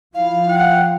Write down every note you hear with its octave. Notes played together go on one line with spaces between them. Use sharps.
F3 E4 F5
F#5 G5